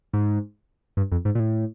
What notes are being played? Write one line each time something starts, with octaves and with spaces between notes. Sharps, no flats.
G#2
G2
F2
G#2
A#2
A2